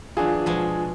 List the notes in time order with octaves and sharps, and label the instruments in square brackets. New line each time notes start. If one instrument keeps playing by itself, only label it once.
[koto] E3 F#3 [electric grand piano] D4 G#4 [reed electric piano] F4 G#5
[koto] B2 F3 G#3